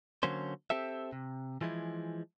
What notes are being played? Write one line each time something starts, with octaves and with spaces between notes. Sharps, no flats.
D3 F#3 A#3 C#4 C5
C4 G4 A4 E5
C3
E3 F3 G#3 E4